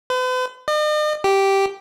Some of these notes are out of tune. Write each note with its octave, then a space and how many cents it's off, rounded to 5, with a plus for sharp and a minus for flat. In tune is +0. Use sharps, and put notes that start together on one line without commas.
B4 +45
D#5 -45
G4 -5